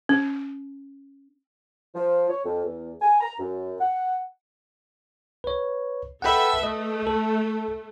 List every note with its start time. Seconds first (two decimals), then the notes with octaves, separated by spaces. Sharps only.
0.09 C#4
1.95 F3
2.30 C#5
2.45 F2
2.65 E2
3.02 G#5
3.21 A#5
3.40 F#2
3.81 F#5
5.44 B4 C#5
6.22 A4 B4 E5 F#5 G5 B5
6.63 A3 D#5
7.07 A4